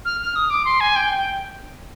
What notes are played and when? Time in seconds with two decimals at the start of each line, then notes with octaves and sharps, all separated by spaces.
0.05 F6
0.21 F6
0.36 D#6
0.50 D6
0.65 C6
0.80 G#5
0.96 G5
1.18 G5